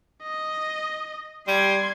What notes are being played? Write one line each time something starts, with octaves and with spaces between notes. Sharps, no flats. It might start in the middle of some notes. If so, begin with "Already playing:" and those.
D#5
G3 C6 G#6